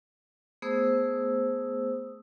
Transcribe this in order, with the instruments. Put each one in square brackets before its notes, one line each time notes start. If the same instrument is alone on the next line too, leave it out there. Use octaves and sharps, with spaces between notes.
[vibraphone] A3 B3 G#4 C5 D#6 E6